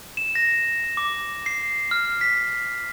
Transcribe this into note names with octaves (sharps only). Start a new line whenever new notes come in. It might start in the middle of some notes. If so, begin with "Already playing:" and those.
E7
A#6
D6
C7
F6
B6